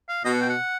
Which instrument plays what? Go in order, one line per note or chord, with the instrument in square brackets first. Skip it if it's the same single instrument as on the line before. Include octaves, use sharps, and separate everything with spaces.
[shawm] F5
[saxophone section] B2 [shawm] D#5
[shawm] F#5
G5
F#5